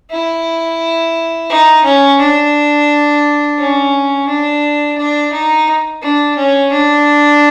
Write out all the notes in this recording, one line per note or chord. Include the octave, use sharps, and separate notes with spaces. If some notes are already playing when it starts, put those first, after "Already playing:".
E4
D#4
C#4
D4
C#4
D4
D4
D#4
D4
C#4
D4